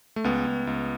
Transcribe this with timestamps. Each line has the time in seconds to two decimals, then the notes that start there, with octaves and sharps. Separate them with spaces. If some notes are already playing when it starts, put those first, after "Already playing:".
0.16 A3
0.24 C#2 B3
0.47 C#2
0.67 C#2